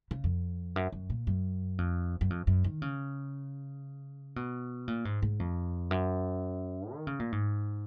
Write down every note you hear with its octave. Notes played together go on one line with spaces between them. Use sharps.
C#3
F2
F#2
F#2
A#2
F#2
F2
F#2
F2
F#2
D#3
C#3
B2
A#2
G#2
G#2
F2
F#2
D#3
C#3
A#2
G#2